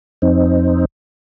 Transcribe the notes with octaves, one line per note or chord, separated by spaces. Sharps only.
F2 C4 D#4